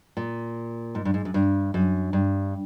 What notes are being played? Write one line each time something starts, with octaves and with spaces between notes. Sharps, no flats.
A#2
G#2
G2
G#2
F#2
G2
F#2
G2